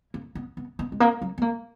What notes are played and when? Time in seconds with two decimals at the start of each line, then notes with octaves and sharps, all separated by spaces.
0.14 A#3
0.35 B3
0.57 B3
0.79 B3
0.92 G#3
1.00 A#3
1.22 F#3
1.38 B3
1.42 A#3